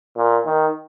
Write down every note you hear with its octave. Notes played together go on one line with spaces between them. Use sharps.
A#2
D#3